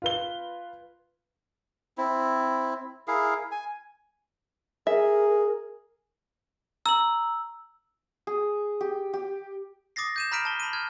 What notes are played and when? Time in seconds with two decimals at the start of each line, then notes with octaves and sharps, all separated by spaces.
0.02 F4 B4 G7
1.98 C4 E4
3.08 E4 G#4 A#4 F5
3.52 G#5
4.87 G#4 A#4 E5
6.86 A#5 E6 F#7
8.27 G#4
8.81 G4
9.13 G4
9.96 D6 D#6 A6 A#6 C7
10.16 G6 D#7 E7
10.32 A#5 B5 F6 B6 D7 E7
10.45 A5 G7
10.60 B5 D#7
10.73 F6 G#6